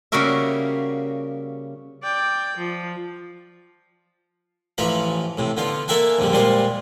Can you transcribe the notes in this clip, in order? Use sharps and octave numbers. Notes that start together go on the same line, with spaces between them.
C#3 G3 A#3 F#4 A#4 E5
D5 G5
F3
A1 E3 F3 A#5 B5
A2 C3
D3 B3 F4
A#3 A4 A#4 E5 F#5 G#5
A#1 F2 D3 G3
A#2 G3 G#3 F4 C5